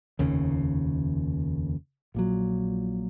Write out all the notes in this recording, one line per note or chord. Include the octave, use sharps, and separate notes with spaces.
F1 D#2 C#3
A#1 A#2 F#3